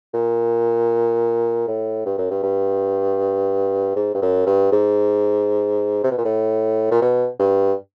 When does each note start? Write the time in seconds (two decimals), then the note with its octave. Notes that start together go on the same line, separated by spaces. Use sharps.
0.14 A#2
1.67 A2
2.06 G2
2.18 F#2
2.31 G2
2.43 G2
3.96 G#2
4.15 G2
4.22 F#2
4.46 G2
4.72 G#2
6.03 C3
6.11 B2
6.18 A#2
6.25 A2
6.91 A#2
7.02 B2
7.39 G2